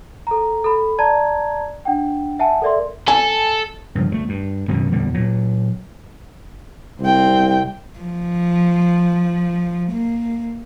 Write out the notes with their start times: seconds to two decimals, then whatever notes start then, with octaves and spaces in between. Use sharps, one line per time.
0.27 A4 A#5
0.64 A4 B5
0.99 D5 A5 A#5 G#6
1.85 D4 F#5 G5
2.39 E5 F#5 G#5 A5
2.62 A4 A#4 D5 E5 C6
3.08 A4 G#5
3.95 G2 C#3 F3
4.10 D2 F3 A3
4.29 G2
4.68 G#1 F#2 B2 D#3
4.92 D#1 E2 D3 G3
5.14 A#2 F#3
7.01 C2 C4 G5
7.99 F3
9.92 A#3